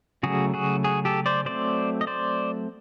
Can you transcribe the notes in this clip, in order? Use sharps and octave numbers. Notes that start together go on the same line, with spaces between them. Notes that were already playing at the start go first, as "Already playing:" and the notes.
C#3 F#3 A3 F#4 G#4
F#4 G#4
F#4 G#4
G4 A4
C5 D5
F#3 A3 C4 C5 D5
D#5
C5 D5